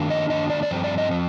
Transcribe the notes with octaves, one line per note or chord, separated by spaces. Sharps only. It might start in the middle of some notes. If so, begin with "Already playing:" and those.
Already playing: D#3 A#3 D4
D#5
D#3 A#3 D4 D#5
D5
D5
G2 F3 C4 C5
D5
D#5
F3 C4